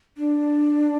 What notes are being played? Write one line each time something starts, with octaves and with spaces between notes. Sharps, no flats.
D4